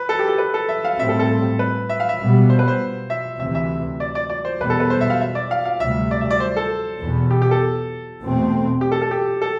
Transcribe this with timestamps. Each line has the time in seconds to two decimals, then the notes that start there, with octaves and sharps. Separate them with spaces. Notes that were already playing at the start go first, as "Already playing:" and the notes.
Already playing: B4
0.09 A4
0.19 G4
0.28 A4
0.38 B4
0.54 A4
0.69 E5
0.85 F5
0.99 A2 G3 C4 E5
1.09 A4
1.19 A4
1.59 B4
1.89 E5
2.00 F5
2.09 E5
2.20 B2 G3 B3
2.50 C5
2.59 B4
2.68 C5
3.10 E5
3.39 D2 C3 E3 E5
3.55 E5
4.00 D5
4.15 D5
4.30 D5
4.45 C5
4.60 E2 B2 G3 B3 B4
4.70 A4
4.80 B4
4.90 C5
5.01 E5
5.10 F5
5.21 E5
5.35 D5
5.51 F5
5.65 F5
5.80 D2 C3 G3 E5
6.11 D5
6.21 E5
6.31 D5
6.40 C5
6.57 A4
7.00 E2 B2 B3
7.31 G4
7.42 G4
7.51 A4
8.21 E2 B2 A3 C4
8.81 G4
8.92 A4
9.02 A4
9.11 G4
9.42 A4